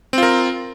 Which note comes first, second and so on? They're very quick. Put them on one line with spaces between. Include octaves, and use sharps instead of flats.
C4 F4 A#4